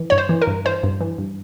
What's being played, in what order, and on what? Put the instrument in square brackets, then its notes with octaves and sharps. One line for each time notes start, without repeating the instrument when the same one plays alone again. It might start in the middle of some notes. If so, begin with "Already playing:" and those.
Already playing: [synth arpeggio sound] E3
G2 C#5
C5
E3
A#4
G2
E3 C5
G2
E3
G2